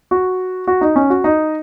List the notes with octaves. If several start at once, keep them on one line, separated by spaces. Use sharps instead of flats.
F#4
F#4
D#4
C#4
F#4
D#4